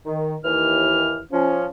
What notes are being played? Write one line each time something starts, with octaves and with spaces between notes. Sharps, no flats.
D#3
D#2 E3 F6
F3 C#4